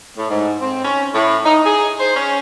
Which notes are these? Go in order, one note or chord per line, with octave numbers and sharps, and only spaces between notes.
A2
G#2
C4
C#4
A2
D#4
G#4
C5
C#4